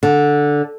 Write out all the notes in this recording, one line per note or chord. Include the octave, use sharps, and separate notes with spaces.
D3